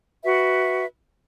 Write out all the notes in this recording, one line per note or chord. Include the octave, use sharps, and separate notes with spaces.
F#4 B4 E5